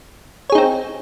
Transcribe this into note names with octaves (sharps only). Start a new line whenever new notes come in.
C4 D#4 G#4 C#5